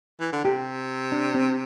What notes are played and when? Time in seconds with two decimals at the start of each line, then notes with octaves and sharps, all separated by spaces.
0.21 E3
0.32 D3
0.45 C3 G4
1.12 D4
1.34 C4